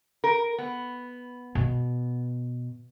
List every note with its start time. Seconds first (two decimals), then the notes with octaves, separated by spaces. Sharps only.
0.24 A#4
0.58 B3
1.55 B2